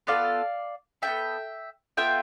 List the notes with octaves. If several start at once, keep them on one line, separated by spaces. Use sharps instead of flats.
B3 F4 A4 D5 F5
E4 A4 E5 G5
B3
B3 F4 A4 E5 G5